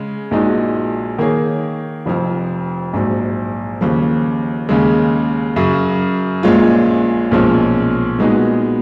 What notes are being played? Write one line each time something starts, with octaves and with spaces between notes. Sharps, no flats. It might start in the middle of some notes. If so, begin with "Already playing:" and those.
Already playing: C#3 G#3
A#1 A#2 G#3 D#4 F#4
D#3 A#3 D#4 G#4 C#5
F1 F2 F3
A#1 G#2 F#3
D#2 C#3 F3
D#2 C#3 G#3
F#2 C#3 F#3
A#1 A#2 G#3 C#4 F4
B1 A#2 F3 G#3 C#4
A#2 G#3 B3 D#4 F#4